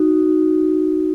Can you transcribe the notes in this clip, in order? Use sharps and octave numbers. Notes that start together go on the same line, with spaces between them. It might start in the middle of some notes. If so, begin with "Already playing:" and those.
Already playing: D#4 F#4